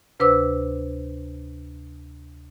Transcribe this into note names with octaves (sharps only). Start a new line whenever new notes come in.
D2 C3 B4 C5 D6 E6